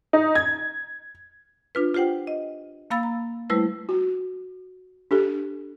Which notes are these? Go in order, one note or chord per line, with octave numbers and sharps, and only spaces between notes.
D#4
G#6
D4 F4 B4
F4 G4 C5 F#5 G5
D#5
A#3 F5 B5 E6 A6
A#5
G3 A3 E4 B4 C5
F#4
D4 G4 A4